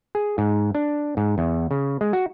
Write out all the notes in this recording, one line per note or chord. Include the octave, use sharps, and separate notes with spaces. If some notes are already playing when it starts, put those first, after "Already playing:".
G#4
G#2
D4
G#2
E2
C#3
G#3
F#4